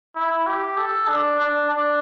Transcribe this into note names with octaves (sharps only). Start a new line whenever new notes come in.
E4
G4
A4
D4
D4
D4